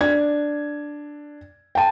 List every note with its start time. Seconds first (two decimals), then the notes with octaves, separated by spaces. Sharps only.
0.01 D4 G#6
1.75 G5 A5